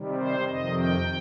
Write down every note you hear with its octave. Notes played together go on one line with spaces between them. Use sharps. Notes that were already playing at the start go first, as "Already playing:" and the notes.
Already playing: C3 D#3 G3
C5
F2 C3 D#3 D#5
G5